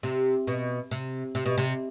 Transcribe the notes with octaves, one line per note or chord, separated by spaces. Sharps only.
C3
B2
C3
C3
B2
C3